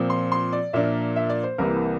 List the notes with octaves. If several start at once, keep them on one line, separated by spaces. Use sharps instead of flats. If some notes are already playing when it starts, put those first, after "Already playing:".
Already playing: A#2 F3 C4
C6
C6
D5
A#2 F3 A#3 D4 E5
E5
D5
C5
C2 C3 E3 A#3 A#4